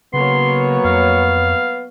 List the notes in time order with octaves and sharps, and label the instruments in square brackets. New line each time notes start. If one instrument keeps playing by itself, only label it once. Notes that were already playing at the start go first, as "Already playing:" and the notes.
[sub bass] C#3 [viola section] F#3 A#3 C#5 [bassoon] B3 [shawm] C6
[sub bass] F2 [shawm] F5